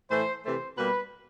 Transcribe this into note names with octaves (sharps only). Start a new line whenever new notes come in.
A2 E3 A3 C5
C3 E3 A3 C5
B2 G3 A#3 B4